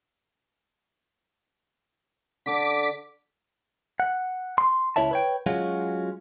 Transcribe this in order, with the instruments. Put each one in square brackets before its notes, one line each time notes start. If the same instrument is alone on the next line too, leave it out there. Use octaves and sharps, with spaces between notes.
[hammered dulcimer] D3 D4 [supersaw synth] D6 B6
[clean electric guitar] F#5
C6
C#2 E4 C#5 E5 A5
B4 C#5 G5
F#3 G#3 C#4 F4 F#4